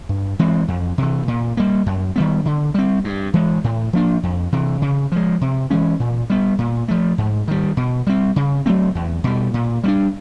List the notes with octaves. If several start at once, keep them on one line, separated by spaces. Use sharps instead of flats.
G2
E3 G#3 C4
F2
C3 E3
A#2
G3 A#3
F#2
D#3 G3 B3
D3
G3 C4
G2
E3 G#3
A2
F3 A#3 D4
F2
C3 E3
C#3
F3 G#3
C3
E3 G#3 C#4
A#2
G3 B3
A#2
F3 A3
G#2
D#3 G3
B2
G3 C4
C#3
F#3 A3 C4
E2
B2 G3
A#2
G3 A#3 D4